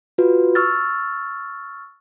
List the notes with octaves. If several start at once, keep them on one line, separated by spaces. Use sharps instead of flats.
F4 F#4 B4
C#6 E6 F6 A6